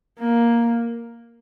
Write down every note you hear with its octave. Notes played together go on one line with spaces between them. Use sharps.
A#3